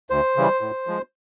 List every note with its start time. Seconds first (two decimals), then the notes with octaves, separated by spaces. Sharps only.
0.10 D2 C5
0.36 C#3 E3 G3
0.61 A2
0.87 F3 G#3